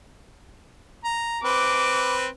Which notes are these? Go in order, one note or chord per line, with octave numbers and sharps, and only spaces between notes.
A#5
C4 B4 D6